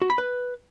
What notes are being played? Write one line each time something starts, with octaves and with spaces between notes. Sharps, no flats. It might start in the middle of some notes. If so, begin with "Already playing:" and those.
F#4
B5
B4